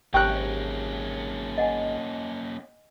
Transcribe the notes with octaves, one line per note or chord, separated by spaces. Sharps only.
G#1 A#3 C#4 G4 G5 A5 F#6
D#5 F#5 G#5